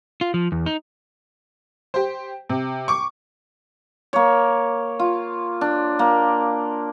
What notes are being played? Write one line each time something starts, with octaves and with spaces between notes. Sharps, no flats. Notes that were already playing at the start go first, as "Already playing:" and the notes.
F4
F3
E2
D#4
G4 C5
C3
C#6 D6
A#3 C#5
F4
D4
A#3